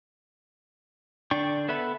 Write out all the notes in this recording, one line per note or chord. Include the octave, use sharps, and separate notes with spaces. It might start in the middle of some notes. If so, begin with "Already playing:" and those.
D3 D4 D5 G5 C#6
B3 A4 B4 E5 B5